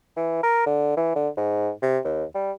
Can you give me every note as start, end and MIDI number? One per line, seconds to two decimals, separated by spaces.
0.17 0.39 52
0.43 0.62 70
0.66 0.92 50
0.97 1.12 52
1.15 1.29 50
1.37 1.71 44
1.82 1.99 48
2.04 2.24 39
2.34 2.52 55